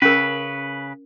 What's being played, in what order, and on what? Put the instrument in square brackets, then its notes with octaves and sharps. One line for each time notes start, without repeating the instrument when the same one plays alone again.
[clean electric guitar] C#3 B4 [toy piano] C#4 A#4